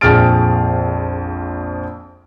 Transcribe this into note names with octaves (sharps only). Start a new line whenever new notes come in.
A#1 F2 G#4 F6 A6 D7